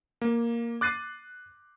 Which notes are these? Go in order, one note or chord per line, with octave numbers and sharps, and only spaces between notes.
A#3
D6 F#6 A6 C7 D#7